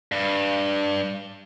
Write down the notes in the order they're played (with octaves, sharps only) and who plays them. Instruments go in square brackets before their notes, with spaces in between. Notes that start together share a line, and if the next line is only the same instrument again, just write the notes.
[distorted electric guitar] G2